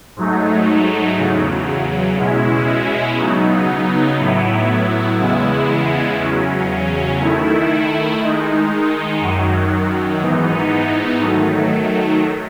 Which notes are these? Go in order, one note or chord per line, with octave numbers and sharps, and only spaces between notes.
G#2 F#3 A3 D#4
E2 C#3 F#3
B2 G#3 C#4 E4
C#3 F#3 B3 D#4
A2 F#3 B3 E4
E2 C#3 G#3 B3 E4
E2 C#3 F#3 C#4
D#3 A3 E4
D#3 G#3 D#4
F#2 D#3 F#3
G#2 E3 B3 D#4
D#3 F#3 A3